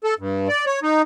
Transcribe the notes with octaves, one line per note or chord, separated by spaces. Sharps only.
A4
G2
D5
C#5
D#4